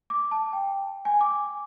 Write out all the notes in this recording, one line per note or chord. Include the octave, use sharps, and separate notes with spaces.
D6
A5
G5
G#5
D6